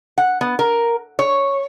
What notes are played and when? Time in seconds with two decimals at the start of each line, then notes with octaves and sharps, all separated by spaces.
0.18 F#5
0.41 B3
0.59 A#4
1.19 C#5